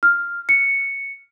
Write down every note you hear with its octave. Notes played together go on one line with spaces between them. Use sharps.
F6
C#7